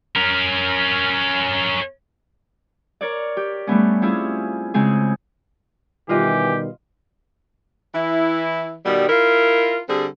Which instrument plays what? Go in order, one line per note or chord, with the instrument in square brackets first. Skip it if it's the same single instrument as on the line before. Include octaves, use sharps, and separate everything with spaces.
[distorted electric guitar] C#4 A#4
[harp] A#4 C#5 D5
G4
G3 A3 B3 C#4
C4 C#4 E4 F4 G#4
C#3 G#3 C4 G#4
[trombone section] B2 D#3 G3 [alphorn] E3 [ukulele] F4 B4 D#5 [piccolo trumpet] G4
[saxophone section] E3 E4
B2 D#3 G3
E4 F4 A#4
D3 G3 C4 G#4